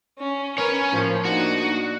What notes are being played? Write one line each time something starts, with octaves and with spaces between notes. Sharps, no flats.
C#4
C#4 A#4 B4 C#5
A2 F3 A#3
A#3 D4 D#4 F#4